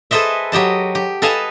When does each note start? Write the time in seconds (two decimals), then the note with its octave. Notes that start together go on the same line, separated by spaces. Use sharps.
0.11 G#4 A4 B4 C5 D#5 E5
0.52 F#3 G4 D#5 A5
0.95 G4
1.22 A4 B4 D#5 F5 G#5 A5